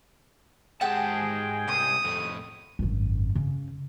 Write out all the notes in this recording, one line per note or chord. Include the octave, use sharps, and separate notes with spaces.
G#2 G#3 G4 G#4 F#5 G5 A5
C2 D#6
F2 A2
G#1 F#2
C#3 C#4